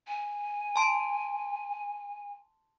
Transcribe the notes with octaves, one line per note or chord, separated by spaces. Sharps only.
G#5
A5 C6 D7